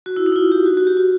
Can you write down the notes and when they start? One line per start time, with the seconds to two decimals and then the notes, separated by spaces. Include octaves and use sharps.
0.06 F#4
0.16 E4
0.26 D#4
0.32 E4
0.36 F4
0.52 G4
0.66 F#4
0.77 F#4
0.87 G4
0.97 F#4